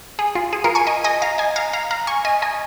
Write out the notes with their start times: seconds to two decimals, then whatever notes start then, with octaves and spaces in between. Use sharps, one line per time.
0.19 G#4
0.35 F4
0.53 G#4
0.64 F4 A#4
0.75 G#5 C#6
0.87 D#5 G#5
1.04 D#5 G#5
1.22 F5 A#5
1.38 D#5 G#5
1.56 F5 A#5
1.73 F5 A#5
1.91 F5 A#5
2.07 G#5 C#6
2.25 D#5 G#5
2.42 D#5 G#5